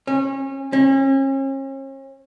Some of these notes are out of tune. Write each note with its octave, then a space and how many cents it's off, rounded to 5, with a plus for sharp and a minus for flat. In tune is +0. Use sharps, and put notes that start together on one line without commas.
C#4 -30
C#4 -40